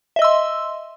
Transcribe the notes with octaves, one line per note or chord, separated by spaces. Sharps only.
D#5 E5 C6 E6